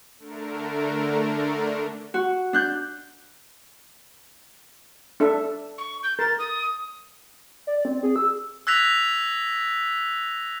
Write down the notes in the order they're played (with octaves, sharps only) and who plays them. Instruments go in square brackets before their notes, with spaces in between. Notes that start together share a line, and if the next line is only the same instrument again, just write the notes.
[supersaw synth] D3 A3 D4 A#4
[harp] F#4
D4 F#6 G6
[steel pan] D4 A4 E5
[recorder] C#6
G6
[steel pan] A#4 [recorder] A6
[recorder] D#6
[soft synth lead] D5
C4
G#4
E6
[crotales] E6 F#6 G#6 A#6 B6 F7